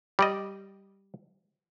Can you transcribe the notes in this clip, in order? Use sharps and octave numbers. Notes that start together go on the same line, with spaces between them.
G3 D5 D#5